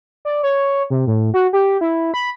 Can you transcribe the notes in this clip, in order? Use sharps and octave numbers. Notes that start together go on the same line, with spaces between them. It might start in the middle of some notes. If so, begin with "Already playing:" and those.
D5
C#5
C3
A2
F#4
G4
E4
B5